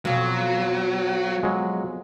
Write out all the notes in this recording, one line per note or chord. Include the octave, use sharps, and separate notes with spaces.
F2 B2 F#3
F#3 G#3